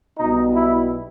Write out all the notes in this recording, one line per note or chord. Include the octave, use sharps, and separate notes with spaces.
B1 B2 G3 D#4
E4